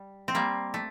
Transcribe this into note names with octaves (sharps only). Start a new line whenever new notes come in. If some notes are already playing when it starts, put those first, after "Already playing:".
Already playing: G3
C4
G3 A#3
A3